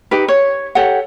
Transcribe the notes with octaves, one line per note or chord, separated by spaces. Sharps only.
D#4 G4 B4
C#5
G4 A4 C#5 F#5